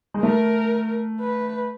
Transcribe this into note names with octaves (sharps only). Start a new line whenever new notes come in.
G#3
A3 A#4
B4